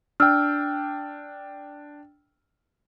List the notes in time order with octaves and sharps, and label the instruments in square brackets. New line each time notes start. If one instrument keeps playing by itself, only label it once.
[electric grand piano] D4 G5 [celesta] E6 F6